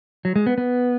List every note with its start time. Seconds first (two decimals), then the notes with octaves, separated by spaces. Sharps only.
0.25 F#3
0.36 G#3
0.47 B3
0.58 B3